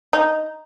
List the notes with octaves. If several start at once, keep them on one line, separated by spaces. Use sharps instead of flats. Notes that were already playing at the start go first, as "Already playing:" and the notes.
D#4